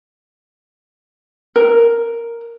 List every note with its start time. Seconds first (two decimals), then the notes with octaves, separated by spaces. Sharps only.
1.56 A#4